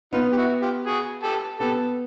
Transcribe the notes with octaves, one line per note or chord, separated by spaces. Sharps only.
B3 D#4 F4
G4
E4 F#4
F4 G4
F#4 G#4
G4 A4
B3 G4 A4